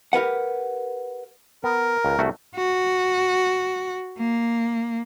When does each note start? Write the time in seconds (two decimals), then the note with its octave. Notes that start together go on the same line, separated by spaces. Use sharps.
0.13 G4 A#4 B4 F#5
1.64 B3 A#4
2.05 C#2
2.19 C2 A3 F#4
2.56 F#4
4.19 A#3